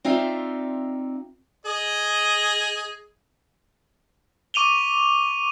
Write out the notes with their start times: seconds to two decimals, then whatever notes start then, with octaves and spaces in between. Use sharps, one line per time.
0.05 C4 D#4 F4 D5 E5 F5
1.66 G#4 D#5
4.54 C#6 D6 D#7 F7 G7